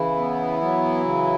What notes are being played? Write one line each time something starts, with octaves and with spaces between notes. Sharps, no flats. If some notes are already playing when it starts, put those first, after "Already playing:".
Already playing: C#3 E3 E4
B3
F#3
C#3